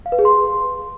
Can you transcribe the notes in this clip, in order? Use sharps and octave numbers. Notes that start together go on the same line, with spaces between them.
F5
B4
G#4
C6